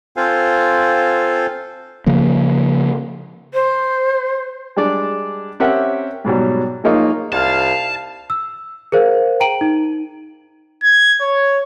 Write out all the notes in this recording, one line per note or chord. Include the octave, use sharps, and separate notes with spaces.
C4 F4 A4 C5 F5 G#5
C#3 F3 A#3
C5
G3 G#3 D4 D5
C4 C#4 G4 A#4 E5 F#5
G#2 B2 F#3 G3
F3 G#3 A#3 D#4 F4 C#5
C2 F5 A5
E6
G#4 A#4 C5 F5
G5 A#5 D7 D#7 F#7
D#4
G#6
C#5